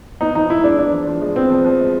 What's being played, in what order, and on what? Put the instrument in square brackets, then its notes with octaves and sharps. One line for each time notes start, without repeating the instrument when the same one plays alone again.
[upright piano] B3 [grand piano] D#4
[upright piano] F3 [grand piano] D#4
[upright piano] F3 [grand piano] E4
[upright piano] G#3 [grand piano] D4
[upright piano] B3 [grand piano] D4
[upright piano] F3
F3
G#3
[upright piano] B3 [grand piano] C4
[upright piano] F3
F3
G#3